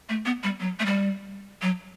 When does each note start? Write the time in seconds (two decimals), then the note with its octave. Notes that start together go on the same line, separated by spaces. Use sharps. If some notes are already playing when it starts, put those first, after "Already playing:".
0.09 A3
0.25 B3
0.43 G3
0.60 F#3
0.80 A3
0.86 G3
1.62 F#3